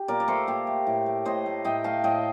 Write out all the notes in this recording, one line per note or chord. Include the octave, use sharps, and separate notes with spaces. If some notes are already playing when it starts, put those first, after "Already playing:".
Already playing: G4
A#2 A#4 D5
D5
A3 A4 C5
A#2 G4 A#4
A3
A2
A3
A2 C5 D#5
A3
A2 D#5 G5
A3 F5 A5
A2 D#5 G5